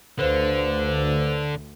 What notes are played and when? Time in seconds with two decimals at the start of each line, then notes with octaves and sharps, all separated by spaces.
0.19 D2 D3 B4 C5 F5